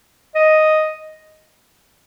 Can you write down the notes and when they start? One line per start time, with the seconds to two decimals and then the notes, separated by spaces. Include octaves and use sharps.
0.35 D#5